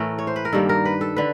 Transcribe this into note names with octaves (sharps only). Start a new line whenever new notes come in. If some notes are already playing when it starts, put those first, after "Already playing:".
Already playing: A2 E3 A3 A#4
C#5
C5
B4
A#4
G2 D#3 G3 A#3 A4
A#4
B4
A4
D3 B4